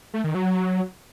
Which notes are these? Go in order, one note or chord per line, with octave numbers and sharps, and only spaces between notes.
A3
D#3
F#3